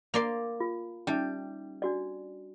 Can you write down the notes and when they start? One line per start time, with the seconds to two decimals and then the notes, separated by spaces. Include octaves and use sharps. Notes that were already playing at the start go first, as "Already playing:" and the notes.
0.14 A#3 D5 C6
0.60 F4
1.07 G3 C#4 D#4 E5
1.82 D4 F#4 D5